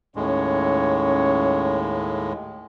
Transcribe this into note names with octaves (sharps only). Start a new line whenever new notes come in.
D#2 A2 G#3 C#4 C#5